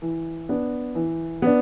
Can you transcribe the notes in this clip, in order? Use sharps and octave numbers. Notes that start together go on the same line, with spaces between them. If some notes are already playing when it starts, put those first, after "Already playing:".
E3
B3 D4
E3
B3 D4